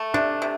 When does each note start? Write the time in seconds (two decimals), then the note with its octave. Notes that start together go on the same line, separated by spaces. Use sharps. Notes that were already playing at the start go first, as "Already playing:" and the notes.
Already playing: A3
0.14 C3 D4
0.42 C3